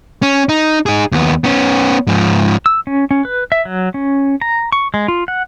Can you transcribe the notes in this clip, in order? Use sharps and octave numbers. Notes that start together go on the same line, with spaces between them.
C#4
D#4
D#4 G#4
D#2 B3
B3 C#4
G#2 F3
E6
C#4
C#4
B4
E5
F#3
C#4
A#5
C#6
G#3
F4
F#5